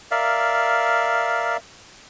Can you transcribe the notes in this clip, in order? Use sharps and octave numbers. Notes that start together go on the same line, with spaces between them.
A#4 D5 E5 F5